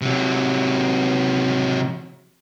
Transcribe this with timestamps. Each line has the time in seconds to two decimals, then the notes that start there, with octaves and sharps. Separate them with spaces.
0.02 C3 F#3